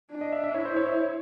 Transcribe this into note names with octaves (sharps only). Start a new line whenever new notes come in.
D4
D#5
E5
E5
E4 C#5
C5
C#5
C#5